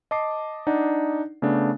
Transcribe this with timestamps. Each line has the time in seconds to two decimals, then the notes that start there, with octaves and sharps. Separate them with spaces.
0.11 D#5 A5 D6 C7
0.67 D4 D#4 D5 F#5
1.42 C#3 A3 B3 D4